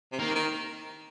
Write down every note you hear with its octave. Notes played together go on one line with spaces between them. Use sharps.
C3
D#3 A#3
D#3